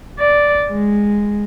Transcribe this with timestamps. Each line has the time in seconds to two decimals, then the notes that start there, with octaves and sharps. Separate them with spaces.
0.19 D5
0.70 G#3